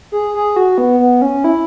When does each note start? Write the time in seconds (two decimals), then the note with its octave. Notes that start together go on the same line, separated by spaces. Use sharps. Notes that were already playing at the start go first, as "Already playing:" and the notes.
0.12 G#4
0.34 G#4
0.56 F#4
0.78 B3
0.99 B3
1.22 C#4
1.44 E4